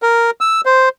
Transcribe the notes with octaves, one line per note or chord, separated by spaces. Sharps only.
A#4
E6
C5